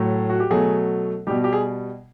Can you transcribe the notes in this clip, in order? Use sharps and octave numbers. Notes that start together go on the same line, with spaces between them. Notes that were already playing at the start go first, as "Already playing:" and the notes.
Already playing: A2 F#3 A3
F#4
G4
B2 F#3 A3 G#4
B2 G3 G4
G4
G#4